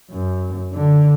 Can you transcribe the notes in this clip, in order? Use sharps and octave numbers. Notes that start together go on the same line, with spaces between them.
F#2
D3